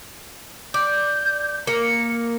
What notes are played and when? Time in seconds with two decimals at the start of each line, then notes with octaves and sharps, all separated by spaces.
0.74 D5 G6
1.67 A#3 C#7